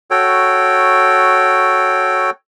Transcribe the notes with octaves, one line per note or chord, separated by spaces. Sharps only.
F#4 A4 C#5 G5